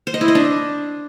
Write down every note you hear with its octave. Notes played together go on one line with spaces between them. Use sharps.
C5
D#5
E4
D#5
D4